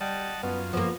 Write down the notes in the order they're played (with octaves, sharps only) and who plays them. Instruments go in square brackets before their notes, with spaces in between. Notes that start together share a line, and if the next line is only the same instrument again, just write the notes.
[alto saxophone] G3 [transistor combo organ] D#5 F#5 A5
[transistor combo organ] F#2 F4 [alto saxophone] B3
[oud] F3 A#3 [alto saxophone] B3